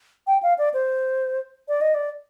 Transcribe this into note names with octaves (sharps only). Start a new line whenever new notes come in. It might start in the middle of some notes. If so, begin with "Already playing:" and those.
G5
F5
D5
C5
D5
D#5
D5